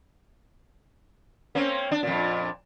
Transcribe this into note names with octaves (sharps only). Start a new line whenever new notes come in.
A#3 C4 C#4
D4
F2 A#2